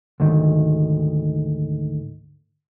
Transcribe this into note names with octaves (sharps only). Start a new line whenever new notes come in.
D2 G#2 D#3